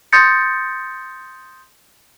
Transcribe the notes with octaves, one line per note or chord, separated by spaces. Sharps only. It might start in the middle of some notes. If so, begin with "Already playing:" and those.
C6 D#6 G6 A6 A#6 C#7